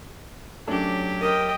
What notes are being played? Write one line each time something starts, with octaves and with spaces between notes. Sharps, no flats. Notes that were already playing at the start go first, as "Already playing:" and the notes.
F#3 A3 C#4 D4 G4
A#4 D#5 G5